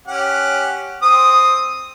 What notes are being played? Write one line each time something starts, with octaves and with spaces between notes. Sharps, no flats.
C#4 G4 F#5
C4 D#6